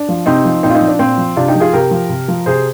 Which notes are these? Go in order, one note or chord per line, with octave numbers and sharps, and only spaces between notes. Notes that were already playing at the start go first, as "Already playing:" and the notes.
Already playing: D4
F3
C3 C4 D#4
F3
A#2 C4 D#4
F4
C4 D#4
F3
D4
A#2 C4
F3
C3 D4 F4
D#4 G4
F3
F4 G#4
C3 G4 A#4
F3
C3
F3
C3 G#4 C5